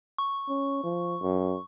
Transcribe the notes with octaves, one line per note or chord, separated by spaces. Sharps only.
C#6
C#4
F3
F#2